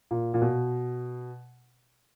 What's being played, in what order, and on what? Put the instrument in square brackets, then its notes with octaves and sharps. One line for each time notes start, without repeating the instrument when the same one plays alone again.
[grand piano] A#2
A#2
B2